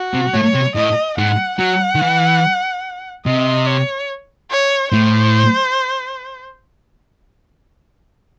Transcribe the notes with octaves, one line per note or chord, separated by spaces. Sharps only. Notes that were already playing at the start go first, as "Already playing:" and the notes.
Already playing: F#4
C3
A2 C#5
C3
A2 D#5
G#2 F#5
F#3 F#5
D#3
E3
C3 D#5
C#5
C#5
A2 C5